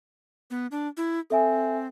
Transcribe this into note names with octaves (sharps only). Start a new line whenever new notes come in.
B3
D4
E4
C4 A4 E5 G#5